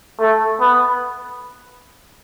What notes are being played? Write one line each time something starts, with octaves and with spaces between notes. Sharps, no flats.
A3
B3